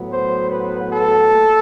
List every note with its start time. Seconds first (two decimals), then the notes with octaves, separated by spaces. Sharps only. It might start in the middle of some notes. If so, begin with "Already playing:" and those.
Already playing: A2 F#3 B3
0.12 C5
0.51 B4
0.91 A4
1.31 A#2